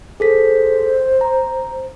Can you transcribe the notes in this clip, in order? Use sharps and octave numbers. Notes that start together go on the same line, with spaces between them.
G#4 A4 C5 B6
A#5